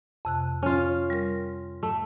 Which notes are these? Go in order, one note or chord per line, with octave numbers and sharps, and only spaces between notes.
F2 C3 F#6
C#4 F4
G3 A#4
A3